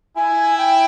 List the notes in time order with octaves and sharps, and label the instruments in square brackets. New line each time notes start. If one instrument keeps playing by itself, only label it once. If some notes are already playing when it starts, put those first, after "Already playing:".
[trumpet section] E4 [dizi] G#5
[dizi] G5